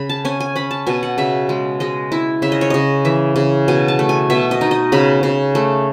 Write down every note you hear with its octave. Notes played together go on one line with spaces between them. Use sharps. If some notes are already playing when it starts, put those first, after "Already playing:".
Already playing: C#3 B5
A5
C#4 G#5
G#5
C#4 B5
A5
B2 G#5
F#5
C#3 E5
G#3
G#3 D#5
E4
C#3 E5
D#5
C#5
C#3 D#5
E3 E5
C#3
B2 G#5
A5
A3
G#5
B2 E5
D#5
D#4
D#5
C#3 B5
C#3
A3